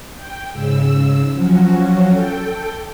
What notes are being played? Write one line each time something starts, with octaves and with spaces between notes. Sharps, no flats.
G5
G#2 C#3 E6
F3 F#3 C#4 F#4
A4 G5